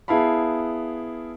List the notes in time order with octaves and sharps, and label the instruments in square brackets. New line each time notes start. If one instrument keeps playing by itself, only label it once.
[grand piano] B3 E4 G#4 F5 A5 B5